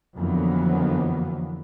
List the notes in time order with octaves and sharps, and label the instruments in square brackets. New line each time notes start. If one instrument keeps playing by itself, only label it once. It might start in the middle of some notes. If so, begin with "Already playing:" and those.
[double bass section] F2 D3 E3 F#3 A#3 B3